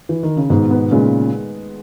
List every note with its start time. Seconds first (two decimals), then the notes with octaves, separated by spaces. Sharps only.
0.09 E3
0.23 D#3
0.37 C#3
0.49 G#2 B2 D#3
0.71 B3
0.91 A#2 C#3 G#3